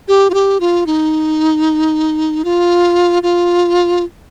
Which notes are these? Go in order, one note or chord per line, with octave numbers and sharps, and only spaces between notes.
G4
F4
G4
F4
D#4
F4
F4